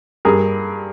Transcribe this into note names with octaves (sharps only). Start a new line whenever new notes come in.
G2 G#4 A#4